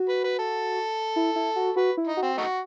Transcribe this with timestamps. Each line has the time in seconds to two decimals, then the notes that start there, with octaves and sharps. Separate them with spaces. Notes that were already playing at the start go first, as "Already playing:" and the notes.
Already playing: F#4
0.09 B4
0.24 B4
0.39 A4
1.16 E4
1.36 E4
1.56 F#4
1.76 F#4 B4
1.97 E4
2.07 D#4
2.17 F#4
2.22 C4
2.38 A3 D#4 F#4